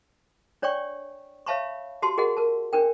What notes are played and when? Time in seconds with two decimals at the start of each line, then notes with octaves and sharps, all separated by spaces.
0.62 D4 C#5 D5 G5 C#6
1.46 C#5 E5 F5 A5 B5 C#6
2.02 F#4 G4 A5 C6
2.18 F#4 G#4 A#4 D#5 F#5
2.37 A#4 A5
2.73 C#4 D4 A#4 G5